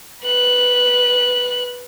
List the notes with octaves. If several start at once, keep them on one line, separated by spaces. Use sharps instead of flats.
B4 F#6